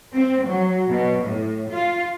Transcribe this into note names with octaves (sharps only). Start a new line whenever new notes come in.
C4
F#3
B2
A2
F4